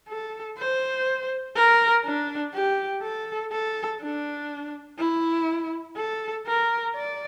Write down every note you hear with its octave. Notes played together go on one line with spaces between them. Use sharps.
A4
C5
A#4
D4
G4
A4
A4
D4
E4
A4
A#4
D5